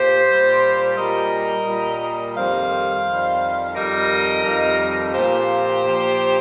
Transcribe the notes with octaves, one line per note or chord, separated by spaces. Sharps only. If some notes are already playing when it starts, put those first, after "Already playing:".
Already playing: A#2 G4 C5
A#2 G3
A#2 G3 A#4 D#5
A#2 G3
F2 D#3 G3 C5 F5
F2 D#3 G3
F2 D#3 G3 A#4 D#5
F2 D#3 G3
A#2 F3 G4 C5
A#2 F3